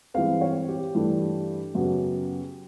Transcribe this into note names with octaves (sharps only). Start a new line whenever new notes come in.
G2 E3 G#3 C4 F5
C#5
G4
G2 E3 A3 D4
F#2 C#3 F#3 B3